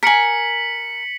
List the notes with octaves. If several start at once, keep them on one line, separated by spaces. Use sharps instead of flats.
A#4 G#5 B6 C#7 F#7